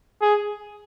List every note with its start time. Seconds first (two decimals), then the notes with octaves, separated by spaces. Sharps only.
0.22 G#4